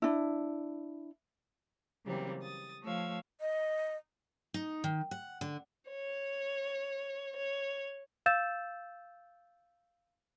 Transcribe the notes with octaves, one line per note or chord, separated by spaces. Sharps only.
D4 E4
C#3 E3 F#3 G3 A#3 C4
D#6 A6
F3 A3 C#5 F5 E6 G#6
D#5
D#4
D#3
F#5
D3
C#5
C#5
F5 E6 G6 A6 E7